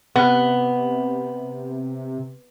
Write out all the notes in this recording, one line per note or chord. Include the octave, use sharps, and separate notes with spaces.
C3 B3